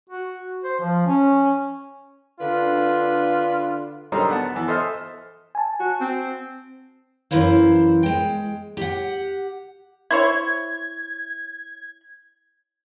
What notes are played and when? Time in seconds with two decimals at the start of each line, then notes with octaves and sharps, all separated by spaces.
0.10 F#4
0.64 C5
0.80 F3
1.06 C#4
2.39 D3 D4 F4 B4
4.12 D3 F#3 G3 D#4 A#4 C5
4.29 B3 F#5 A5
4.56 E3 B3
4.68 A4 C5 D#5 E5 A5 F6
5.55 G#5 A5
5.80 F#4
6.01 C4
7.31 F#2 E3 E4 C5 F5
8.03 G#3 G5
8.77 G4 F#5
10.11 E4 C5 C#5 G#6